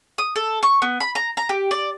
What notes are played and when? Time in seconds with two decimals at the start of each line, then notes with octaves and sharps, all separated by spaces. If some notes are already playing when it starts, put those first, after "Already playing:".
0.18 D#6
0.36 A4
0.63 C#6
0.82 B3
1.00 B5
1.15 A#5
1.37 A#5
1.49 G4
1.71 D5